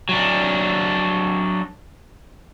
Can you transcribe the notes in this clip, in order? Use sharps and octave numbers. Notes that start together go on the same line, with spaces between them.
F#3 D4